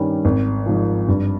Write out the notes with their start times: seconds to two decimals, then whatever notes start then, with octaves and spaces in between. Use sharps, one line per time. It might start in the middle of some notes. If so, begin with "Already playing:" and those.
Already playing: G2 D#3 G3 C#4
0.25 G#1
0.66 G#2 F3
1.08 G2